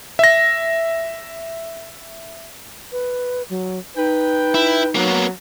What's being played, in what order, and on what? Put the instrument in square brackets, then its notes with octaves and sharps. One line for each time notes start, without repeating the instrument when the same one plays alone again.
[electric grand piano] E5 A#6
[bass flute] B4
F#3
[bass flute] D#4 [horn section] B4 G5
[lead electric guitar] E4
[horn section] F#3 [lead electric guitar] A#3 B3